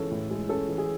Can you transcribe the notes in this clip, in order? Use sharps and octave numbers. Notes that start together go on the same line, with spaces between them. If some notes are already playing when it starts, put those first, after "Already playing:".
Already playing: E3 G#3 C#4 A4
A2
G#3
C#4 A4
E3
G#4